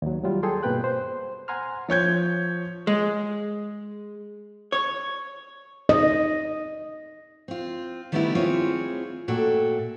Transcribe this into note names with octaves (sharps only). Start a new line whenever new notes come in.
D#2 F#3
F#3 G3 F4
G#4 A4 G5 C6
G2 B2 A#3 B4 G5 F#6
C5
F#5 G#5 A#5 C6 F6
F3 C#5 G6 G#6
G#3
C#5
D#5
C4 F4
D#3 G3 A3 B3 C4 E4
G3 C4 F4 G#4 C#5
A#2 A3 F#4 A4 G5